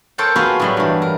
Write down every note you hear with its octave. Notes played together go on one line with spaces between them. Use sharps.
A4 A#4 C5 C#5 G5 A5
B3 F4 F#4 G#4 B4 F5
A2 F#3 G3
G2 E3
A#4